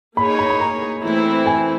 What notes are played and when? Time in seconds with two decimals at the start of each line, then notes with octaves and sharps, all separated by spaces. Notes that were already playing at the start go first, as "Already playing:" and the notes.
0.17 A#3 D#4 G#4 C#5 B5
0.39 B5
0.50 B5
0.60 A#5
1.03 E3 A3 C4 E4
1.46 G#5